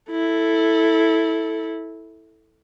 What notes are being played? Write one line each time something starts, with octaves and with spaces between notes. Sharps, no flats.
E4 A4